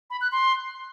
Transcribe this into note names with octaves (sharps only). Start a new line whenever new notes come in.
B5
F#6
C6